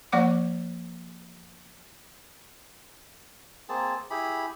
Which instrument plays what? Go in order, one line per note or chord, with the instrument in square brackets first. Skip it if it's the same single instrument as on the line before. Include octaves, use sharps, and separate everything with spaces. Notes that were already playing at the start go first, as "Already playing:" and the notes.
[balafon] F3 A#3 D5 F#5 D6
[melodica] A#3 C4 G#4 A5
E4 G4 G#4 B5